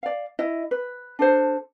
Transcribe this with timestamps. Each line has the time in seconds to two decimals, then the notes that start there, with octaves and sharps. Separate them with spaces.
0.03 D5 F5
0.39 E4 D#5
0.71 B4
1.19 D4 A4 C5